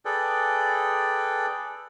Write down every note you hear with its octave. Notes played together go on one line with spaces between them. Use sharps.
G#4 A4 B4 D5 G5